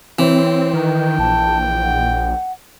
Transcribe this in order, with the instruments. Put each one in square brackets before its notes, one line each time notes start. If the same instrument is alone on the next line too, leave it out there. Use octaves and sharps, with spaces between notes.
[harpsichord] E3 [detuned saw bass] C4 [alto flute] C#5
[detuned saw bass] D#3 [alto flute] B4 [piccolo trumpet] G5
[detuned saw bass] A#1 [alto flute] A5
[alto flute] F#5